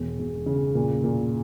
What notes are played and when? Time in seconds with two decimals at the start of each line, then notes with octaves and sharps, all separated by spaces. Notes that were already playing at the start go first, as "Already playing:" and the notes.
Already playing: E1
0.19 E1
0.46 C#3
0.75 A#2
1.04 A#2